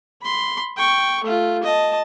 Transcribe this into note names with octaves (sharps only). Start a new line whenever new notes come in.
B5 C6
G5 C#6
A3 F4
D#5 A5